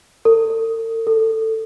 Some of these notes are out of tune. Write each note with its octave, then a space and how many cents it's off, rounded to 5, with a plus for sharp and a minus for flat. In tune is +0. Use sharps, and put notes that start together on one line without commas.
A4 +45
A4 +15